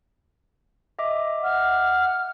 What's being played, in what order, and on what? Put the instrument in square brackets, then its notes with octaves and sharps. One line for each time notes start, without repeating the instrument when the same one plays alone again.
[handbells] D#5 E5 D6
[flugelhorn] F#5 [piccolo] F6